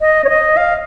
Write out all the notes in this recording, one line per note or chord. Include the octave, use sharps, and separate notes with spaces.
D#5
C#5
D#5
F5